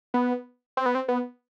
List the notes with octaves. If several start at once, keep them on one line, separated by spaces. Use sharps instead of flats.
B3
C4
B3
C4
B3